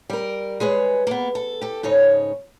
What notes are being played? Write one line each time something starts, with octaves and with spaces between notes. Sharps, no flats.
G3 A#4
G#3 G#4 B4 C#5
A#3 B3
A4
G4 A4
G#2 C#3 D#4 C#5